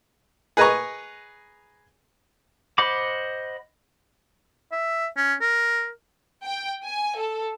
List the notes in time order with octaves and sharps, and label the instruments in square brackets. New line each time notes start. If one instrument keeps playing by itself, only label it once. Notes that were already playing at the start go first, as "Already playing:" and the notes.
[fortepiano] G#4 B4 D#5 G#5 A#5 C#6
[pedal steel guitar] C5 D#5 F#5 B5 D6
[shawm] E5
C#4
A#4
[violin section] G5
G#5
A4